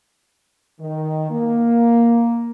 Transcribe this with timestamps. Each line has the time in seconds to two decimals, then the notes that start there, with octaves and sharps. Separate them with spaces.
0.81 D#3
1.31 A#3